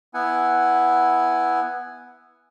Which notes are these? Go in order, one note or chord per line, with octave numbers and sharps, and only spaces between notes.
B3 E4 F#5 G#5